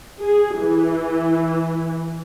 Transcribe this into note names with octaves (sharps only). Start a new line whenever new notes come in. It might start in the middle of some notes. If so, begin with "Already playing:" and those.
G#4
E3